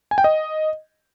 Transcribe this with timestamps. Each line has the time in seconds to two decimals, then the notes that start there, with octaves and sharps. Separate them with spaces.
0.11 G#5
0.18 G5
0.24 D#5